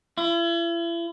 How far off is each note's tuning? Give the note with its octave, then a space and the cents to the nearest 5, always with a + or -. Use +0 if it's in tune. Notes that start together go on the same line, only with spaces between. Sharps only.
E4 +40